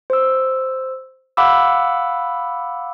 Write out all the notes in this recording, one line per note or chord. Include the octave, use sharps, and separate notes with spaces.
C5 E6
F5 F#5 B5 D6 E6